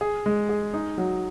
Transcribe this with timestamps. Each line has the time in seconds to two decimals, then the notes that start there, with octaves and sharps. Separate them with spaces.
0.01 G#4
0.26 G#3
0.49 G#4
0.74 D#4
0.98 F#3